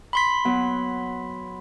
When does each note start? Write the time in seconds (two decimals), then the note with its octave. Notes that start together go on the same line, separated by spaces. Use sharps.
0.13 B5 C6 B6
0.45 F#3 B3